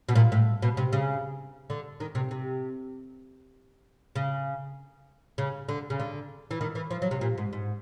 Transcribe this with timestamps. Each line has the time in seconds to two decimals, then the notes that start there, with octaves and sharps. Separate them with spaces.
0.09 B2
0.15 A#2
0.32 A2
0.62 B2
0.77 C3
0.93 C#3
1.70 D3
2.00 D#3
2.15 C3
2.31 C3
4.16 C#3
5.38 C#3
5.69 D3
5.90 C#3
6.00 D3
6.51 E3
6.61 D#3
6.75 E3
6.91 F3
7.02 F#3
7.11 C3
7.21 A#2
7.38 G#2
7.53 G#2